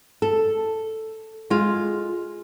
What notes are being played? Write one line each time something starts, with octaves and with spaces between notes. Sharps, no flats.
A4
G#3 F4